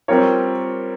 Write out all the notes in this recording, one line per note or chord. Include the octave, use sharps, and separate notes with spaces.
G3 C4 F4 A#4 C#5